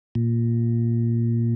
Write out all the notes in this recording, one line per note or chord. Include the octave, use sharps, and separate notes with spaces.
A#2